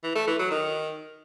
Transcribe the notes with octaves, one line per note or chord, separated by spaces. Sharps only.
E3
A3
E3
F#3
D#3